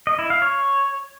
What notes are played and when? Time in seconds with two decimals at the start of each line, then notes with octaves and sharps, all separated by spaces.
0.07 D#5
0.19 E4
0.30 F5
0.42 C#5